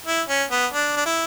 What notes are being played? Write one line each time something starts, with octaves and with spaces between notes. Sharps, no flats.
E4
C#4
B3
D4
D4
E4